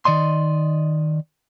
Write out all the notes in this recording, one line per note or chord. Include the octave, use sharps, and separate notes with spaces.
D#3 D5 D#5 C6